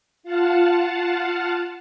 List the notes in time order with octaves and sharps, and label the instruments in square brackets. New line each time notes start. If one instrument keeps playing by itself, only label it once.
[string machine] F4 F5 F#5 A5